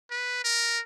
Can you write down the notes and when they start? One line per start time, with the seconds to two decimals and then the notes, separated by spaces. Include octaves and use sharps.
0.11 B4
0.44 A#4